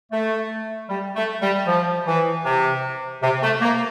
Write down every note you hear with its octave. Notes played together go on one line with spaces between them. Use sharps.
A3
G3
A3
G3
F3
E3
C3
C3
A3
A#3